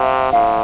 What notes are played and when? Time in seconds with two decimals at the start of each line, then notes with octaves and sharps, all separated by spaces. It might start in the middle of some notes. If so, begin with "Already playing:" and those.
Already playing: C3 E5 F5
0.33 A2 F5